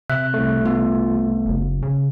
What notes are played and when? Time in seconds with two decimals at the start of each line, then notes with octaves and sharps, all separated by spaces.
0.10 C3 E5 F#6
0.34 C2 A3
0.65 B3 F4
1.46 F#1
1.83 C#3